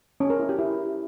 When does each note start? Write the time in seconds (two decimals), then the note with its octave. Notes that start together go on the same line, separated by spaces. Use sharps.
0.20 C#4
0.30 A#4
0.40 E4
0.49 G4
0.59 E4